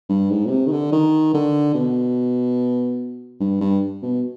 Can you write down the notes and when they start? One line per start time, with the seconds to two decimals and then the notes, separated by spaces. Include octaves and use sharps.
0.09 G2
0.30 G#2
0.46 B2
0.50 C3
0.66 D#3
0.72 D3
0.92 D#3
1.34 D3
1.75 B2
3.40 G2
3.61 G2
4.02 B2